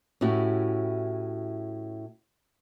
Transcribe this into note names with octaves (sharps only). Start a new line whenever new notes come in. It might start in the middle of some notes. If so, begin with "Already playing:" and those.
A2 C#4 E4 F#4 G4